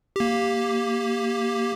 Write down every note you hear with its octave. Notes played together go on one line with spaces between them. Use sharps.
A#3 G4